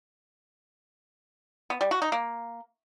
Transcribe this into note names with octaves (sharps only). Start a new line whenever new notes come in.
B3
G3
F#4
D#4
A#3